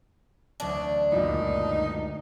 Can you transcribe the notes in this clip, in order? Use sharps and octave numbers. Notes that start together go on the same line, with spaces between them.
D2 F#3 D4 D5
C#2 F#2 A#2 D#4